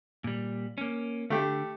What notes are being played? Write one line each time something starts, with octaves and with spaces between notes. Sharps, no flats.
A#2 G3
A#3 C#4
D3 A3 G4